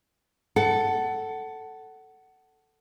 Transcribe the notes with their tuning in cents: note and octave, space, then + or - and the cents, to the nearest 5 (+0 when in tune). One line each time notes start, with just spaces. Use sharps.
A4 +0 F#5 +20